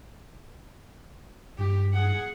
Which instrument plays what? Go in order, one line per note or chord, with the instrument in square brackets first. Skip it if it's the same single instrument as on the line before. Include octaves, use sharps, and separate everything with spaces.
[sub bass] G2 [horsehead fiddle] G4
[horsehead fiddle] G#4 F#5